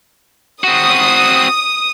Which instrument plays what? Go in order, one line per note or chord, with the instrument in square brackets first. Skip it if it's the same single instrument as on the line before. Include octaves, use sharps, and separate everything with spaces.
[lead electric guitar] C4 F#4 [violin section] D#6